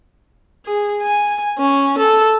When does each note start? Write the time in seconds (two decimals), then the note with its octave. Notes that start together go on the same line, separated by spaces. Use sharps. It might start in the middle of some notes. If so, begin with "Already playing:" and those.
0.65 G#4
1.03 G#5
1.59 C#4
1.98 A4